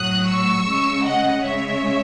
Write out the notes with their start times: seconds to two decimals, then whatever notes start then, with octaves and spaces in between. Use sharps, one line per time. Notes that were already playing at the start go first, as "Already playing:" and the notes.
Already playing: A2 F#3 D#6 F#6
0.28 C#6 E6
0.66 C#3 G#3
1.05 D#5 F#5
1.43 C#3 G#3 C#5 E5